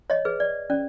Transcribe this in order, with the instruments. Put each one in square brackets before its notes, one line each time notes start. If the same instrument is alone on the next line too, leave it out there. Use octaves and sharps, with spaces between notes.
[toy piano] C#5 D#5
G#4 B4
D5
C#4 D5